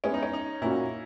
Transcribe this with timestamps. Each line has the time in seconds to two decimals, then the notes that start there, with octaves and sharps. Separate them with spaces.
0.04 G#3 B3 C#4 E4 G#4
0.14 D#4
0.23 C#4
0.33 D#4
0.61 A#2 A#3 C#4 E4 F#4